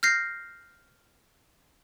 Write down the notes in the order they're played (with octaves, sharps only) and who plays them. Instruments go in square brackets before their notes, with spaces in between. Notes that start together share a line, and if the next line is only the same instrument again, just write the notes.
[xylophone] F6 G6 A#6 C7